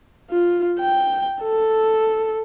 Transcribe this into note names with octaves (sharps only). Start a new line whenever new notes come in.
F4
G5
A4